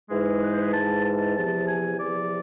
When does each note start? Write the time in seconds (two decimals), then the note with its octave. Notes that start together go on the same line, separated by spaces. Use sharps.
0.10 G#2 E3 G#3
0.42 B4
0.51 C5
0.61 B4
0.73 G#2 E3 G#3 A5
1.04 A5
1.36 E2 C3 F3 A5
1.68 G#5
1.99 E2 C3 F3 D5